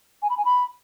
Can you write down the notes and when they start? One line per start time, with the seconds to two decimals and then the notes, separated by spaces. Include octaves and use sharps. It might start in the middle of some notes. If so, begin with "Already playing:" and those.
0.22 G#5
0.30 B5
0.37 G#5
0.45 B5